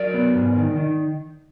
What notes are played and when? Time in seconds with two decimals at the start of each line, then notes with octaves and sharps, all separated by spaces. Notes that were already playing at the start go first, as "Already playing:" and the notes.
Already playing: F#3 A#4 D5
0.14 B3
0.35 G#2
0.56 D#3
0.77 D#3